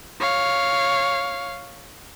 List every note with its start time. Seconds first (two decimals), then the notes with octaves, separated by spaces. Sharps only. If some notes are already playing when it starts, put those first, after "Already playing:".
0.20 C#5 F5